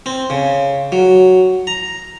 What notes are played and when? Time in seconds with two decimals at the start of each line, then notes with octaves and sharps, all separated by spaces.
0.06 C4
0.30 C#3
0.92 F#3
1.67 A#5